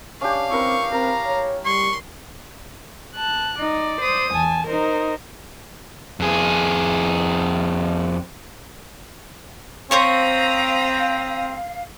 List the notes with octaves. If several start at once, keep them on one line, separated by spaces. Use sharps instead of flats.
C#4 D4 G4 F5
C4 E4 A#4 B4 C#6
C4 A#4 A#5
C#5
G3 C6 C#6
A5 F#6
D#4 D5
C5 D#6
E2 G#5 A5
D#4 A#4 C5
F2 G#4
C4 C5 C#5 F5 A#5 B5 C#6 D#6